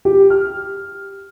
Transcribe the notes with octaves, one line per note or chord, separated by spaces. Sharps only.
G4
F6